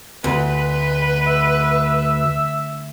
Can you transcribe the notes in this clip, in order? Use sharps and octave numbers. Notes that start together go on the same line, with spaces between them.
D2 B4
E5